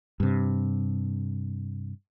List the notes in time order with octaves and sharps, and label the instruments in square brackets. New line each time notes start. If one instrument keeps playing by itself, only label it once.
[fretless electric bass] G2 C3